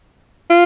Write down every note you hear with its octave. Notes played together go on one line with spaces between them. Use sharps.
F4